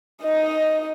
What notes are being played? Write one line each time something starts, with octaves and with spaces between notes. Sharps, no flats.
D#4 D#5